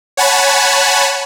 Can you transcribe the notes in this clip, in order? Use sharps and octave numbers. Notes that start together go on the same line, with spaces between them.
C#5 F#5 G#5 A5 B5